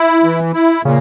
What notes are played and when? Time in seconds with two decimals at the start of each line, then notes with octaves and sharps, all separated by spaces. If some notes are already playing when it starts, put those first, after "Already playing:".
Already playing: E4
0.23 E3
0.54 E4
0.84 A#2 C#3